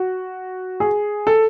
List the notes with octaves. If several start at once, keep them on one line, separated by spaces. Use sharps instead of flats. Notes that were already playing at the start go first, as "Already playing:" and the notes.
Already playing: F#4
G#4
A4